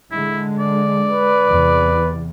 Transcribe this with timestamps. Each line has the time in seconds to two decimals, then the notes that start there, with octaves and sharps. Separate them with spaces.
0.11 D3 G#3 E4
0.59 D5
1.08 B4
1.48 E2 C3